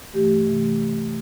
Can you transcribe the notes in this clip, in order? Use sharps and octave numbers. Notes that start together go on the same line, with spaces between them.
G2 E3 A3 G4
C3 E3 A3